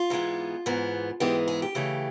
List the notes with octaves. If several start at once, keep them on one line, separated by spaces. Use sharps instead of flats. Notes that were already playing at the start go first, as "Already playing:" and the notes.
Already playing: F4
G#2 E3 G#3 B3
G#2 E3 G#3 B3
G#2 E3 G#3 B3 G4
G#4
G4
C#3 E3 A3